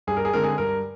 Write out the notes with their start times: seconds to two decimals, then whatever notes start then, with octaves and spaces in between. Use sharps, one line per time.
0.07 G2 G#4
0.17 A#4
0.25 G#4
0.33 D3 G#3 C4 A#4
0.43 G#4
0.58 G2 A#4